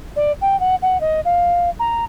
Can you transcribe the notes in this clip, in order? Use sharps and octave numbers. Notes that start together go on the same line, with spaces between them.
D5
G5
F#5
F#5
D#5
F5
A#5